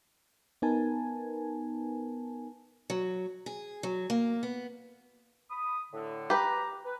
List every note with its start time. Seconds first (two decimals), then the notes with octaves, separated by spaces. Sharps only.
0.62 B3 D#4 A#4 B4 G#5 A5
2.90 F#3
3.46 G#4
3.83 F#3
4.10 A#3
4.43 B3
5.50 B5 D#6
5.92 A2 D3
6.30 G4 B4 A#5
6.84 B4